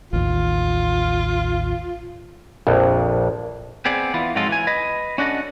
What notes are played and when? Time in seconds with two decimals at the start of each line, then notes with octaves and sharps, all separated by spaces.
0.13 A1 D#2 F4
2.67 A#1 F2
3.85 B3 C4 G#4 D5
4.14 E3 B3 F4
4.35 F2 G#2 F#3 G#3 F4 A4
4.49 E3 G#5
4.67 B4 D#5
5.18 C#4 D4 F#4 A4 D#5